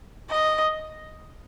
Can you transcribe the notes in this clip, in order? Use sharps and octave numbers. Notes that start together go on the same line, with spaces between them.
D#5